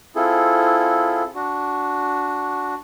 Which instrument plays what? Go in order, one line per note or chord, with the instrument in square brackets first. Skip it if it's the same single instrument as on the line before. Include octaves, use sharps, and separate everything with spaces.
[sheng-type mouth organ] C4 E4 F4 G#4 A4
D4 F#4